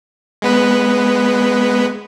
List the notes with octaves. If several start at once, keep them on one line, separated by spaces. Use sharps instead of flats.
G#3 B3 B4